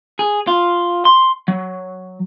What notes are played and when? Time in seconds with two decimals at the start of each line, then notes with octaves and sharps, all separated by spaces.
0.19 G#4
0.47 F4
1.05 C6
1.48 F#3